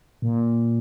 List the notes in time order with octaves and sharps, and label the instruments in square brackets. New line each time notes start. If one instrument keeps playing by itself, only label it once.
[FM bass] A#2